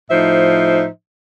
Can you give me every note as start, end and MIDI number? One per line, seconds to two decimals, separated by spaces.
0.11 0.86 45
0.11 0.86 53
0.11 0.86 63
0.11 0.86 72
0.11 0.86 76